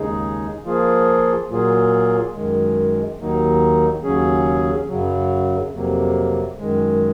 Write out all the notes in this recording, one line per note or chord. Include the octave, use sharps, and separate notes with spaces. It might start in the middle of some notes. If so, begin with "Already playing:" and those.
Already playing: D#2 C#3 G#3 D#4 G#4
F3 A#3 F4 G#4
A#2 F#3 A#3 F4 G#4
F#2 D#3 G#3
D#2 D#3 F#3 A#3 D#4
D#2 C#3 F#3 C#4 G#4
F#2 C#3 F#3
F2 C3 F#3 A#3
F#2 D#3 G#3